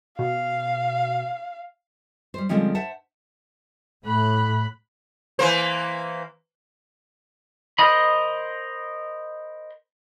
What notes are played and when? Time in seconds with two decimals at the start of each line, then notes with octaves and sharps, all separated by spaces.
0.19 B2 F5
2.34 G3 C5
2.49 D3 F3 G3 G#3 C4 C#4
2.75 C5 E5 F#5 A5
4.05 A2 B5 F#6
5.39 E3 A#3 C5
7.79 A#4 C5 D#5 B5